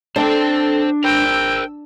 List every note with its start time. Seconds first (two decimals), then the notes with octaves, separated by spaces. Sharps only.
0.16 D4 A4 C5 G5
1.04 G#1 A#4 C5 G5 E6